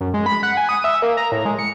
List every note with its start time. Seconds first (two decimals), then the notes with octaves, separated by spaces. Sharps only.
0.01 F#2
0.14 G#3
0.26 B5
0.43 F#5
0.57 G#5
0.69 D#6
0.84 E5
1.02 A#3
1.17 A#5
1.32 A2
1.45 G#3
1.59 C#7